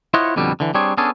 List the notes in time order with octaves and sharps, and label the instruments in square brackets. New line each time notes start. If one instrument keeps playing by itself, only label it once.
[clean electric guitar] E4 F4 C5 C#5 D#5 F#5
F2 B2 D3 G3
D3 E3
G3 C4 D4 G#4 C#5
B3 C#4 D4 G#4 A4